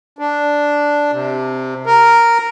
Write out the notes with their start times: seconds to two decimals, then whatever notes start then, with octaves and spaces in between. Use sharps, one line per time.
0.19 D4
1.12 C3
1.86 A#4